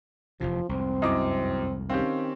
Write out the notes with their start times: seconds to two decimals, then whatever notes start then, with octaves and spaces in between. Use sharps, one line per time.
0.41 F1 E2 C3 F3
0.69 C2 F2 G#2 C4
1.02 F#2 E4 D#5 D6 D#6
1.89 D#3 C4 C#4 G4 F5 G5